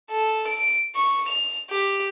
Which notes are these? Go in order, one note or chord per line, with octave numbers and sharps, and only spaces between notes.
A4
D7
C#6
F7
G4